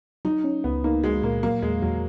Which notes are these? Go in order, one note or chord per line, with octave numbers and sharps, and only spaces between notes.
F#3 D#4
C#4
C#2 B3
A#3 D#4
G#3 F#4
A#2 A#3
F#3 A#3
E2 G#3
E2 F#3